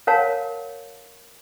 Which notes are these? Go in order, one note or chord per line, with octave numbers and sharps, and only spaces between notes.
A#4 C#5 F5 F#5 A5